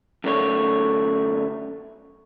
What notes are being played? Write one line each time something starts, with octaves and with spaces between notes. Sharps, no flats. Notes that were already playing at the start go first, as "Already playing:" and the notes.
F#2 D3 A3 C#5